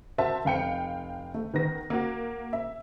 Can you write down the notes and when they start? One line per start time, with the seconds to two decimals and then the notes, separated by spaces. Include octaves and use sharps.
0.18 F#4 A#4 C5 E5 A5
0.45 F1 F5 G5 C#7
1.34 A3
1.54 D#3 B3 A#6
1.90 A#3 F#4
2.53 E5